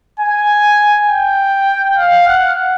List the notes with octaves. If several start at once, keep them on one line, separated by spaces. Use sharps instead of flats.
G#5
G5
F5
F#5